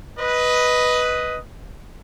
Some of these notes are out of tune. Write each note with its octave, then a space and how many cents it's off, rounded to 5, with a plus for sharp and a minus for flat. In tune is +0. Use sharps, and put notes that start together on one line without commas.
B4 +0 D#5 +10